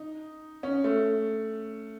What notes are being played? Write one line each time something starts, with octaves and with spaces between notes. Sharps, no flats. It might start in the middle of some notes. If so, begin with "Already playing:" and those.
Already playing: D#4
C#4
A3